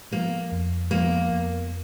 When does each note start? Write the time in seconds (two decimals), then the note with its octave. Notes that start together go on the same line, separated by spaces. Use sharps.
0.12 F3 A#3
0.52 F2
0.91 F3 A#3
1.30 F2